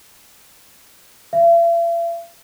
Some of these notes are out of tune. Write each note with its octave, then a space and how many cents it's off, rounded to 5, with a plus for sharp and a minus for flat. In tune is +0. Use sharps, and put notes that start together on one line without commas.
E5 +45